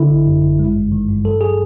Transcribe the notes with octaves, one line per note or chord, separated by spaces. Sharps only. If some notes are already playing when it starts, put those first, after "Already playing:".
Already playing: D3 E4
G#1
F#2
G#1
G#3
G2
D#3
G2
F#3 A4
G#4